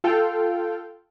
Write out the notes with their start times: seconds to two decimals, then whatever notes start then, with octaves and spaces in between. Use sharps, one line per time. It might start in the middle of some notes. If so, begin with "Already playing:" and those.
0.04 F4 A4 F5 G5